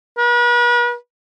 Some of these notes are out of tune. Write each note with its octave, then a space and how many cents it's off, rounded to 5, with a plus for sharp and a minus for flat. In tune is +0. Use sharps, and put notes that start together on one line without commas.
B4 -40